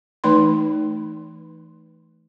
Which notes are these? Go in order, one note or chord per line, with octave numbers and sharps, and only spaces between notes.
E3 A3 D#4 B4 B5 C6